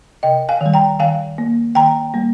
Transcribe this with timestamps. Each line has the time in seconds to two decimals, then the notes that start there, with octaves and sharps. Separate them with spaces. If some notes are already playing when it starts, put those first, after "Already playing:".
0.23 C3 D#5 G5
0.49 F5 G#5
0.61 D#3 G3
0.74 G5 A#5
0.99 D#3 F5 G#5
1.38 A#3
1.75 D#3 G5 A#5
2.14 G3 A#3